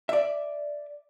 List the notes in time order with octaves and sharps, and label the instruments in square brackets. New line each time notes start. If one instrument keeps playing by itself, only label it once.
[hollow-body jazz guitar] D5 E5